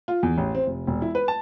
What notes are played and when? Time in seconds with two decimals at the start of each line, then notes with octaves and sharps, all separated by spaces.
0.08 F4
0.23 E2
0.38 A1
0.55 C4
0.67 F1
0.87 E1
1.02 E4
1.15 B4
1.28 A5